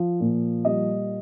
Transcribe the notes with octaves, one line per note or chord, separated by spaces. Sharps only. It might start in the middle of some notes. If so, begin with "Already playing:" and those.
Already playing: F3
A#2
G3 D#5